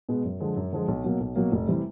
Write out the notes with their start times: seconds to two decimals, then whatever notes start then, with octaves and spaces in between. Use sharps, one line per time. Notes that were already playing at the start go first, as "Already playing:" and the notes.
0.09 B2 G#3 B3
0.24 F#2
0.40 D3 F3 G#3
0.56 F#2
0.72 D3 F3 G#3
0.88 B1
1.04 B2 F#3 A#3
1.20 B1
1.36 B2 F#3 A#3
1.52 F1
1.68 C3 E3 G3